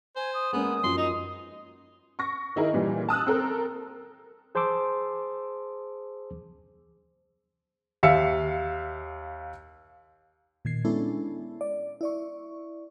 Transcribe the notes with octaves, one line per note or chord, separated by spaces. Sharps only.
C5 G#5
D#6
G#3 A#3 B3 C#4
F#2 F3 C6
D#4 D#6
C#6 A#6
D#3 D#4 E4 G#4 A#4
A#2 E3 G3
A5 D#6 E6 F#6
C4 A4 A#4
G#4 C5 A5 C6 D6 E6
D#2 E5 F5 E6 C#7
A#2 D#3 G#6 C7
G#3 B3 C#4 D4 E4 A4
D5
E4 D5 C#6